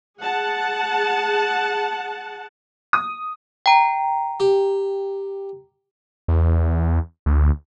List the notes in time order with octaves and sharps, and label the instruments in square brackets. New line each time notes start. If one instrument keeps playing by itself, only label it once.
[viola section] G#4 F#5 A5
[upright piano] D#6
[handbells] G5 A#5
[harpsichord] G4
[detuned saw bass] E2
D2